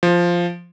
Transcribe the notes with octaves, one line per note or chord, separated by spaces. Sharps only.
F3